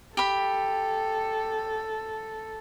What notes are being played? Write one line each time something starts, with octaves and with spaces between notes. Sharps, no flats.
G4 A4 B5